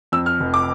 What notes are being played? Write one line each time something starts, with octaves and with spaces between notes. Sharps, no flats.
F2 E6
F6
F1
D6